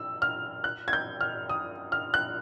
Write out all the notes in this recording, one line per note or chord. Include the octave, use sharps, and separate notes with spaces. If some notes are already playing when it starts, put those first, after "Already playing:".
Already playing: E6
F6
F#6
G#6
G6
F6
D#6
F6
F#6